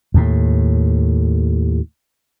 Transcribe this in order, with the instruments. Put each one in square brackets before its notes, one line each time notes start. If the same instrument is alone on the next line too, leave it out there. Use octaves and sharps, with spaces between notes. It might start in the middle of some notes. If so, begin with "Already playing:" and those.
[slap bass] D#2 A2